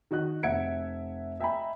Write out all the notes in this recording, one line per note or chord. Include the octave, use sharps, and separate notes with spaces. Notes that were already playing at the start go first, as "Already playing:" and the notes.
D#3 F#4 D#5 F#6
F1 E5 F#5 G#6 C#7 D7
D#5 E5 G5 G#5 A#5 B5